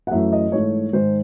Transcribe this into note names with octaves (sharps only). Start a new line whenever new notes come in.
F#5
F#2 E3 A3 E5
D#5
G#2 E3 A3 C#5
G#2 D#3 G#3 C5